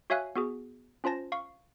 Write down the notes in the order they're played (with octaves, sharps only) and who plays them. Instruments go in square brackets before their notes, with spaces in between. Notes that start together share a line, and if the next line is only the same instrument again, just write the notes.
[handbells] F#4 C#5 E5 F5 G#5 F#6
B3 F#4 G#4
C#4 F4 C5 A5 A#6
F5 C#6